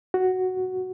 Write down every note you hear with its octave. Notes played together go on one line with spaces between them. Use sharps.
F#4